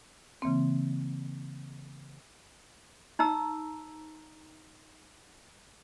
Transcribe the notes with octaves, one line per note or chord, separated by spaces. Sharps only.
C#3 E3 A#3 C4
D#4 A#5 E6